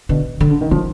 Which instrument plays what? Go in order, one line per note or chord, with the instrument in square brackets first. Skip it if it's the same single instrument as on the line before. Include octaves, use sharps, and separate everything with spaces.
[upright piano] B2 [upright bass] D3
[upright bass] D3
[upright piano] D3
D#3
[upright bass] D#3 [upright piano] F3